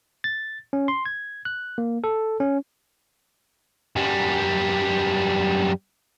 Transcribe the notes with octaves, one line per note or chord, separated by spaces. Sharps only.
A6
C#4
C6
G#6
F#6
A#3
A4
C#4
F#2 G3